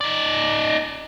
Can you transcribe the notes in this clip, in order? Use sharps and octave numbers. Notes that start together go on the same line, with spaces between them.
D#4 D5